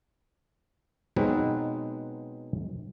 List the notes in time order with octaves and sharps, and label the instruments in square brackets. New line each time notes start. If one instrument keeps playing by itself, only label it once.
[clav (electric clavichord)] B2 F#3 G#3 C4 D#4 B4